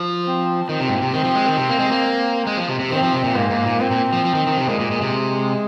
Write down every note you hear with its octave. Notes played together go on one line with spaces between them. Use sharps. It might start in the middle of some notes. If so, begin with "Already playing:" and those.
Already playing: F3
C4
D#3 C4
C3
G#2
A#2
C3
D#3 C4
F3
G#3
D#3
C3
A#3
G#3
A#3
G#3
F3
C3
C3
D#3 C4
F3
C3
A#2
G#2 A#3
G#2
A#2
A#2 C4
A#2
F3
F3
D#3
D#3
C3
A#2 G#3
A#2
A#2
C3